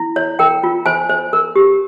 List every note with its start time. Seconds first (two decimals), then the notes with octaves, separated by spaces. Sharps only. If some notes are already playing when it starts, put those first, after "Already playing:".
Already playing: E4
0.16 C#5
0.39 A#4 G5
0.63 F4
0.86 C5 G#5
1.09 C5
1.33 A#4
1.56 G4